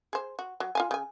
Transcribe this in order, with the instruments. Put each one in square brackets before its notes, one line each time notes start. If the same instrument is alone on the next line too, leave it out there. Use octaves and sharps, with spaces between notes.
[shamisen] G#4 C5
F#4
F#3
F4 F5 G#5
C#3 G#5